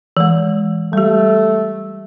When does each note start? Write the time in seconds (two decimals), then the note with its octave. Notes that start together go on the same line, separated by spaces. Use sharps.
0.17 E3 G#3
0.93 G3 A3 G4